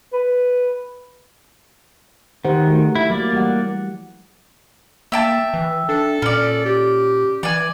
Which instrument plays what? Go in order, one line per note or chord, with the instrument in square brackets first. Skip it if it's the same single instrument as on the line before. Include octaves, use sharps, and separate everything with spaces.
[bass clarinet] B4
[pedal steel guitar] D#3 [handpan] G4 C5 F#5
[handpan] G#3 A3 F#4
[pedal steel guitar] E4
[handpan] F#3 [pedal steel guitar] A#3 D5
[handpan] E3 G3 F#5
[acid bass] A#3 [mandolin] E5 G5 A5
[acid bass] E3
[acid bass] D4 [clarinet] A4
[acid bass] A#2 [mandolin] C#4 D5
[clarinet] G4
[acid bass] E3 [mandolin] D5 G#5